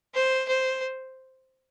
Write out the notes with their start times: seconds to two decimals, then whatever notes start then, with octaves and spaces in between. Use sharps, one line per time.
0.14 C5
0.48 C5